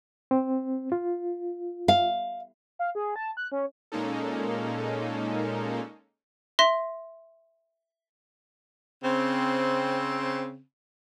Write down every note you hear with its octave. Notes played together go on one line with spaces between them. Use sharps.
C4
F4
F5
F5
G#4
A5
F#6
C#4
A#2 G#3 A#3 C#4 D#4 A4
E5 C6 A#6
C#3 C4